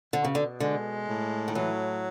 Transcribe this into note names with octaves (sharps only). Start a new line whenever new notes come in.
B2 D3
C#3
D3
D3 G#3
A2
D#3
E3 F#3